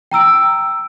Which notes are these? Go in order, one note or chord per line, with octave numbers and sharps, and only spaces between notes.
G5 A#5 E6 D7